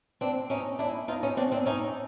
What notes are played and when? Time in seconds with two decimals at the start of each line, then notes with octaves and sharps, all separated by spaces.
0.21 C4 D4
0.50 C#4 D#4
0.79 D4 E4
1.08 D#4 F4
1.23 C#4 D#4
1.37 C4 D4
1.52 C4 D4
1.66 C#4 D#4